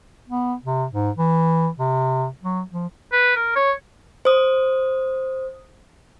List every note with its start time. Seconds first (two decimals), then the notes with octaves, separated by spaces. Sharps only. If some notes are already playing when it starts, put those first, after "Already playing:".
0.29 B3
0.64 C3
0.92 G#2
1.18 E3
1.79 C3
2.43 F#3
2.72 F3
3.12 B4
3.36 A#4
3.56 C#5
4.25 C5 D#6